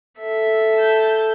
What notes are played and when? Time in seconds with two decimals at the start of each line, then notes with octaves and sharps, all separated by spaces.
0.19 A4 E5
0.75 A5 G6